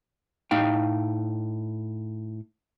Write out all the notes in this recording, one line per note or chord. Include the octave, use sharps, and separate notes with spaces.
A2 D#4 F5 G5